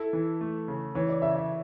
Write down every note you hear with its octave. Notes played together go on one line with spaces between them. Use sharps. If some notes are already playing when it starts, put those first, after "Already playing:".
Already playing: E4 A4
E3
A3
C#3
E3 C#5
D5
C#3 E5
E5